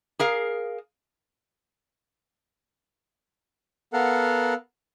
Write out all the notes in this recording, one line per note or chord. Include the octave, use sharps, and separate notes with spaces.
G#4 A#4 F5
B3 A4 A#4 F5 F#5